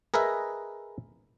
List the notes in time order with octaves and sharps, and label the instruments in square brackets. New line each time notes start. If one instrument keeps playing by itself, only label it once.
[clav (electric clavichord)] G#4 A#4 B4 D#5 E5